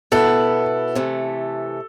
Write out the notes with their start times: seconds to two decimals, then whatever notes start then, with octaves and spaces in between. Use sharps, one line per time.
0.12 B2 B3 E4 A4 B4
0.95 C3 E3 A3